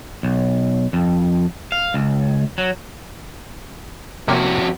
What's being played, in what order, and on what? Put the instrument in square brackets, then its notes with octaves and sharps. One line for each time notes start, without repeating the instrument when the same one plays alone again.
[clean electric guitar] B1
F2
F5
C#2
F#3
[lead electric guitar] F2 F#4 [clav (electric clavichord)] C3 A#3 C#4